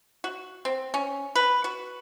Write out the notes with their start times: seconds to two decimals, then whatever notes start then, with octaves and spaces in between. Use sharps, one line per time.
0.24 F#4
0.65 C4
0.94 C#4
1.35 B4
1.64 F#4